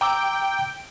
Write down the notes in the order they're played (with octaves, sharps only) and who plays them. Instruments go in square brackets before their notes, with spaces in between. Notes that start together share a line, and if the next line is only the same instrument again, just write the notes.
[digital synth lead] G5 [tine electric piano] A#5 D6 E6